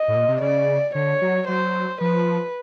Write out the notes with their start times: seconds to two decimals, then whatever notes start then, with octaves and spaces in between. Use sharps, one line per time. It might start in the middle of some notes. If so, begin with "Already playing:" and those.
Already playing: D#5
0.08 A2
0.15 A#2
0.28 C3
0.41 C#3 D5
0.95 D3 C#5
1.22 F#3
1.48 F#3 C5
2.01 F3 B4